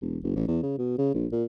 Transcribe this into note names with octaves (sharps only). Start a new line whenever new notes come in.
E1
F#1
A1
E2
C#3
B2
C#3
A#1
A#2